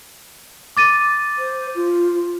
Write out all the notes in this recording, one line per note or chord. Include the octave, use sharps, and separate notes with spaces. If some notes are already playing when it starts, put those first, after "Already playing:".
D6 A6 D#7
C5
F4